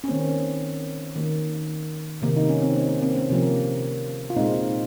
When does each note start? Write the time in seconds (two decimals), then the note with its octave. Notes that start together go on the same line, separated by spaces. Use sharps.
0.04 C#4
0.08 D#3 A#3 C4
1.16 D#3 A#3
2.22 C3 D#3 A#3
2.37 D#4
2.49 C#4
2.62 C4
2.76 A#3
2.89 A#3
3.02 C4
3.15 A#3 C#4
3.29 C3 F3 A#3
4.30 F4
4.36 A#2 G#3 C4 D#4